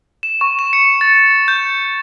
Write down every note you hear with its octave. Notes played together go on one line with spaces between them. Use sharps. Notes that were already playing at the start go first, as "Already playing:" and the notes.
E7
C#6
E7
C#7
A6
G6